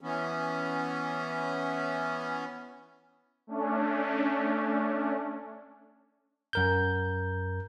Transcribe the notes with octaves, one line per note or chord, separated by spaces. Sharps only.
E3 B3 C#4
A3 C#4 D4
F#2 A#4 G6